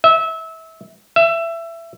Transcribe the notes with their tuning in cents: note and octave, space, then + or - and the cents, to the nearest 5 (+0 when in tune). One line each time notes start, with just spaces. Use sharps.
E5 -25
E5 +20